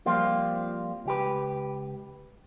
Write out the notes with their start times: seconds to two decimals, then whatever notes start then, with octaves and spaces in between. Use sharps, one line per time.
0.06 F3 G3 A#3 C4 F4
1.06 C#2 G4 B4